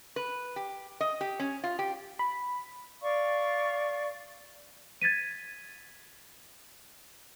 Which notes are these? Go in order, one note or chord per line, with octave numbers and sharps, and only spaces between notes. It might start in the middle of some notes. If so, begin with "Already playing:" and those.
B4
G4
D#5
G4
C#4
F4
G4
B5
D5 F5 C#6
G#6 A6 B6 D#7